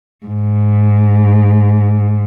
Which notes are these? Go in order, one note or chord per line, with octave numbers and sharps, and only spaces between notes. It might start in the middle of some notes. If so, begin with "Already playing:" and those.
G#2